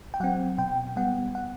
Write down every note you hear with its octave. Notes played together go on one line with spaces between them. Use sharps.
G5
F#3 C4 F#5
B2 G5
G3 B3 F#5
F#5